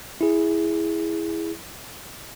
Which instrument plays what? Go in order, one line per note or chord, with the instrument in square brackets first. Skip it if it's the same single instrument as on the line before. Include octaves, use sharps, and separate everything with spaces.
[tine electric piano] E4 G#4